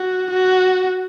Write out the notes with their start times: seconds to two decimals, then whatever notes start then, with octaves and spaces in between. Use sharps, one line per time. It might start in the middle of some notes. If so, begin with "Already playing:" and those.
Already playing: F#4
0.31 F#4